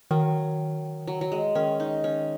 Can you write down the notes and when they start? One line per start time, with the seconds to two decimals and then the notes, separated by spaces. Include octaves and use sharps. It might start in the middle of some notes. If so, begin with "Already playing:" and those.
0.11 D#3 F#3
1.07 F#3
1.21 F#3
1.32 G#3
1.55 D#3 C#4
1.80 D#4
2.04 C#4